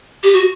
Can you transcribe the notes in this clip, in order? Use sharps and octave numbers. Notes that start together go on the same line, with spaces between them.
G4
F#4